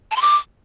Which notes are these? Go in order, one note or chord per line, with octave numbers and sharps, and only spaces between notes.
A5
C6
D6